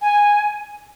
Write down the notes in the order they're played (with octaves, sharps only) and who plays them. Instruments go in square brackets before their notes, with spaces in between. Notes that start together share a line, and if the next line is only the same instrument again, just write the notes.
[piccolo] G#5